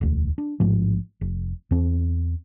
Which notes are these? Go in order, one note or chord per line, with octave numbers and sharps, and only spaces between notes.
E1 D2
D4
A1 G#2 F3
F1
E2 C4